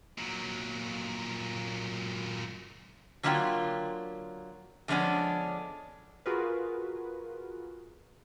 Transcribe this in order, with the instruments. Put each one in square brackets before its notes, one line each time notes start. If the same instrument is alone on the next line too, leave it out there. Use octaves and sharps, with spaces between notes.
[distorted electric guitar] A#2 F#3
[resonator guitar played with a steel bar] D3 F#3 A#3 C#4 F4 G5
D3 F3 G#3 B3 C#4 D4
[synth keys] F4 F#4 G#4 A#4 B4